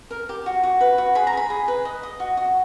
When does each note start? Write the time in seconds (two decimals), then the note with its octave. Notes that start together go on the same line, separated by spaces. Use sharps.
0.10 A#4
0.29 G4
0.46 F#4
0.63 F#4
0.81 B4
0.98 F#4
1.15 G#4 B5
1.27 A#5
1.33 G#4 B5
1.50 G#4
1.68 B4
1.85 D#5
2.03 D#5
2.20 F#4
2.37 F#4